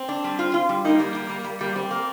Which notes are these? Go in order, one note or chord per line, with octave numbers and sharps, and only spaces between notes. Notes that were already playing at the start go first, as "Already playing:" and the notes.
Already playing: C4
D4
G3
F4
F4
G3
A#3 D#4
G3
G3
G3
G3
G3 A#3
G3 C4
A#3